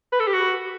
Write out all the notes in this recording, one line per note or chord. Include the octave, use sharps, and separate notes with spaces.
B4
A4
G4
F#4